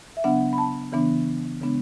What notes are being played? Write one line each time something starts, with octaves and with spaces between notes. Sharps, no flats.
E5
C#3 F#3 B3 D4 F#5
B5
A5
C#3 E3 B3 D4
C#3 G#3 B3 D4